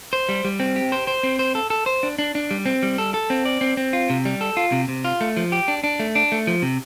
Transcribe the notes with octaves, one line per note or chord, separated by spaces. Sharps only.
C5
G3
G3
C4
G4
C5
C5
C4
C5
A4
A4
C5
D4
D4
D4
G3
C4
G3
A4
A4
C4
D5
C4
C4
F4
C3
G3
A4
F4
C3
C3
F4
A3
F3
G4
D4
D4
A3
D4
A3
F3
C3